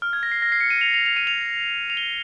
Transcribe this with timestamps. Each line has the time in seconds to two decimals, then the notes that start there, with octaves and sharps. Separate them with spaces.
0.02 F6
0.13 G#6
0.23 A#6
0.32 C7
0.42 A#6
0.52 C7
0.61 C#7
0.70 D#7
0.81 F7
0.94 F7
1.06 F7
1.17 D#7
1.27 F7
1.90 F7
1.97 G7